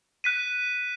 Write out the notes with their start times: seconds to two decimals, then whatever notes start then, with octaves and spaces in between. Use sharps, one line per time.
0.24 F#6 B6 D#7